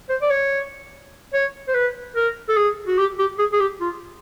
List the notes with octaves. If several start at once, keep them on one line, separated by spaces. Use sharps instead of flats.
C5
D5
C#5
C#5
C5
B4
A#4
A4
G#4
F#4
G4
G4
G#4
G#4
G4
F4